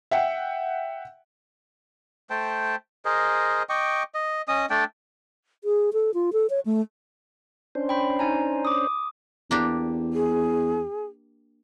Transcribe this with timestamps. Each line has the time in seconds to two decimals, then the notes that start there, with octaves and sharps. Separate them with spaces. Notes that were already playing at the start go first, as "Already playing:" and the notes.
0.11 E5 F#5 G5
2.30 A3 C5 G5 A5
3.05 G#4 A#4 C5 D#5
3.69 D#5 G5 C#6 D6
4.14 D#5
4.48 C#4 D#5 D#6
4.70 A3 D4 D5 G5
5.64 G#4
5.93 A4
6.14 F4
6.33 A4
6.50 C#5
6.66 A3
7.75 C#4 D4 C5
7.89 G5 B5
8.19 D#4 G#5 A#5
8.65 D6 D#6
9.51 E2 A#3 D4 G4
10.13 G#4